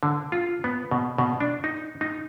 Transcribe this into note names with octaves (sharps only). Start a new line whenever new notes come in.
D3
F4
B3
B2
B2
D4
D#4
D#4